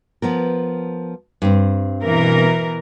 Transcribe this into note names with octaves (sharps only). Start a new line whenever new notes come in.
F3 B3 A#4
G2 C4
B2 E3 A#4